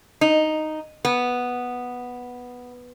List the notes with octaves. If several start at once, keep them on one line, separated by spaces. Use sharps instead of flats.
D#4
B3